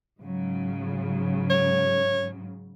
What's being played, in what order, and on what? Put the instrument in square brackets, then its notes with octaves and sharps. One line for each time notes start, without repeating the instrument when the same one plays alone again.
[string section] G#2 C#3 F#3
[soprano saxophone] C#5